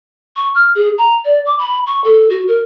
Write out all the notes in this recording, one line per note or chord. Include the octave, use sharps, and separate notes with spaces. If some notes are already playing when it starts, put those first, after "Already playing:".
C#6
F6
G#4
A#5
D5
D6
B5
C#6
A4
F#4
A#4